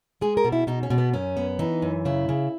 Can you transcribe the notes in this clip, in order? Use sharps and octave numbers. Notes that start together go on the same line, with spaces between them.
G#3 G#4
A#4
B2
E4
B2 D#4
C#4
B2
B3
F#2 C#4
B3
E3 D#4
F#2
C#3 E4
C#3